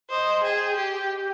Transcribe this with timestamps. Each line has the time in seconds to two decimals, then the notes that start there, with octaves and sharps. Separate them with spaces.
0.10 C5 D#5
0.43 G#4 G5
0.77 G4